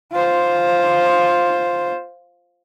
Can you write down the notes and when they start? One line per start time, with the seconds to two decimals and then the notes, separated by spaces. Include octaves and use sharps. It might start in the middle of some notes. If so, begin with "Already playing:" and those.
0.13 F4 C5